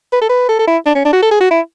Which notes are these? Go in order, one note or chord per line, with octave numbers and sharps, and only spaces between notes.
B4
A4
B4
A4
A4
E4
D4
C#4
D4
F#4
A4
G#4
F#4
E4